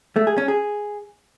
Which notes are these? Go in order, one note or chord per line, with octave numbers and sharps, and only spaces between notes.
A3
G#4
C#4
G#4